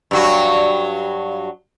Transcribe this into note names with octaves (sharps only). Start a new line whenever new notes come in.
G2 F#3 F#4